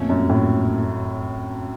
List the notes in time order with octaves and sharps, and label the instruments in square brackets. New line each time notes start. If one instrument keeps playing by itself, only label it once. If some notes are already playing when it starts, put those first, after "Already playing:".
Already playing: [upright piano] F2 [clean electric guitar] A#2 A3 C#4
[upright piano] F#2
A2